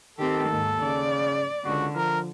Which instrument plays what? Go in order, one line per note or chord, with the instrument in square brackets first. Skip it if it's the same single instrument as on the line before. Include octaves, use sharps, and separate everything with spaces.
[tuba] D#3 [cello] C4 G4 [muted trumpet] A4
[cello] D#2 G#2
[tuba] C#3 [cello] D5
[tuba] C#2 [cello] D3 [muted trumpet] F#4
[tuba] F3 [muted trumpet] A#4